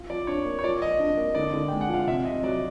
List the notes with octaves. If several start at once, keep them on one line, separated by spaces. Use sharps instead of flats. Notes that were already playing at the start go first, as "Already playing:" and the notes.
Already playing: F4
F3 D5
D4 C#5
A#3
C#5
F3 D5
F3 D#5
D4
A#3
D3 D5
D3
G#3 G5
F#5
F3 F5
C3 E5
C3 D#5
F#3 D5